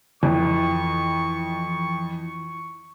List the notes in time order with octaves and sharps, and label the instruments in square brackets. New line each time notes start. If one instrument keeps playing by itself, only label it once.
[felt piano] F2 [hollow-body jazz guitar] E3 [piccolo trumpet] C#6